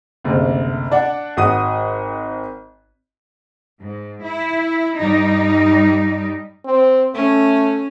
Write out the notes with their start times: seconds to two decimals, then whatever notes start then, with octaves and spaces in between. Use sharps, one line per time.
0.24 F#1 D2 C3
0.91 D4 D5 F#5
1.37 G#1 F#4 D#6 D#7
3.82 G#2
4.23 E4
4.99 G2 G3 D#4
6.65 C4
7.15 A3 C#4